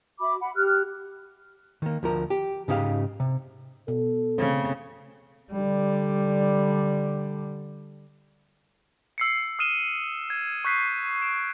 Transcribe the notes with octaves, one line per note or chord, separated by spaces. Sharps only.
F#4 E5 B5 D6
F#5 B5
G4 F6 F#6
D#3 A#3
D2 F3 A#4
G4
G#2 C#3 D#4 G4 F5
C3
B2 A4
C#3 A3 C4
D3 G3
E6 C7 C#7
D#6 F6 C7 D#7 E7 G7
G#6
C#6 F#6 G6 B6 C7
D7 E7